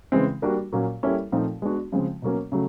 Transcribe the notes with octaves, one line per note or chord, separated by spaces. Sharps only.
C#3 E3 G#3 C4
G3 A#3 D4 F#4
A#2 F#3 A#3 C#4
G3 A#3 C#4 E4 A4
A#2 F3 A3 C4 D#4
G#3 B3 D4 F#4
C#3 F3 G#3 C4
B2 F#3 A#3 C#4
C#3 F#3 A3